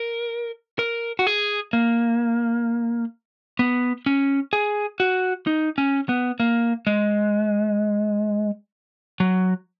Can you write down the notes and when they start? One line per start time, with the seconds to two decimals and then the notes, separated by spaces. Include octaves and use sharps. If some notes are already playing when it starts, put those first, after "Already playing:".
Already playing: A#4
0.79 A#4
1.19 F#4
1.27 G#4
1.73 A#3
3.59 B3
4.06 C#4
4.53 G#4
5.00 F#4
5.47 D#4
5.78 C#4
6.09 B3
6.40 A#3
6.87 G#3
9.20 F#3